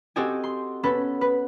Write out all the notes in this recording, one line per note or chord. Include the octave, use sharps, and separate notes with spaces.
C4 F#4 G4 A4 D#5 G#5
C6
B3 C#4 A4 B4
B4